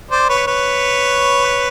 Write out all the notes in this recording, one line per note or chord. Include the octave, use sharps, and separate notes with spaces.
C5 D5
B4 C#5
B4 C#5